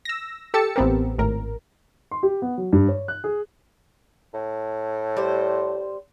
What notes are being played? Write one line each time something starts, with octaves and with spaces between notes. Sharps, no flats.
E6 A#6
G4 A4 E6 A6 C#7
A1 B3 C4 G4 A#4
G#1 A2 A#4
C6
G4
B3
F#3
G2
C#5
F#6
G#4
A2
G3 C5